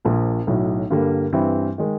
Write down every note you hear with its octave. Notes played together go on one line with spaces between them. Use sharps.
A#1 A#2 F3
B1 A2 F#3
G2 D3 G3 A#3
G2 E3 G3 C4
D#3 G#3